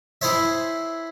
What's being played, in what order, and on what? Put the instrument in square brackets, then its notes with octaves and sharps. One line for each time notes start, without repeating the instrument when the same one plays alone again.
[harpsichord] E4 G#4 C5 C#5 E5